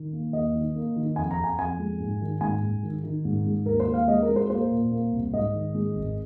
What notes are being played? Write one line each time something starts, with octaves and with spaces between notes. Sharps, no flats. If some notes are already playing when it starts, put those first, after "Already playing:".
Already playing: D#3
A#3
D#2 D#5
D#3
A#3
D#3
F2 G#5
A#5
F2
G#5
F2 G#5
G#3
G#2
D#3
G#2 G#5
G#2
D#3
D#3
G#2
G#3
D#2 A#4
C5
D#2
F5
G#3 D#5
A#4
G#3
C5
A#3 C5
A#2
A#3
C2
G#2 D#5
D#3
G#3
G#1